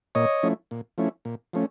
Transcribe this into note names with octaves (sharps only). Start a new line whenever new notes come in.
A#2 C#5 D#5
F3 A3 C#4 E4
A#2
F3 A3 C#4 E4
A#2
F3 A3 C#4